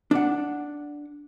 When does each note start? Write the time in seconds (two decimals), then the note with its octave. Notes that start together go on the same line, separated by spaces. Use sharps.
0.11 D4 F#5